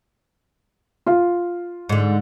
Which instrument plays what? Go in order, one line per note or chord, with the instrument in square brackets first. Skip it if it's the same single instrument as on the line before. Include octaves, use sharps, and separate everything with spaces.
[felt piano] F4 F5
[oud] G#2 D3